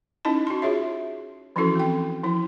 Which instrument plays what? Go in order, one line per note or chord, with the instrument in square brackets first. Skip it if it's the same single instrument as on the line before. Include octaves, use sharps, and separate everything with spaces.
[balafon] C#4 D#4 E4 D#5 A5
F#4 C6
F4 G#4 C#5 E5
E3 F3 C#4 E4 F#4 A4
C4 G5
F3 E4